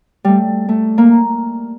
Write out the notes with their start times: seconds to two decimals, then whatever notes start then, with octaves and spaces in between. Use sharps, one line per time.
0.24 G3 A3
0.69 A3
0.98 A#3